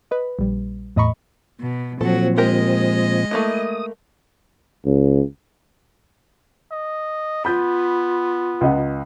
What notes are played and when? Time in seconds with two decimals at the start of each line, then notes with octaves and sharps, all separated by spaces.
0.11 B4 D#5
0.39 A#1 G3
0.96 E2 A2 D#5 A#5 B5 C#6
1.60 B2
2.01 A#2 F3 F#3 C4 F#4 A4
2.37 G#3 G4 A#4 C5 D#5
3.31 A3 A#3 E4 D#6
4.86 C#2
6.71 D#5
7.45 B3 F4 B5 G6
8.61 C#2 D#5 F#5